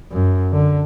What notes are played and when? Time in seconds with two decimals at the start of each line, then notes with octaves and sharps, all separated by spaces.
0.12 F#2
0.53 D3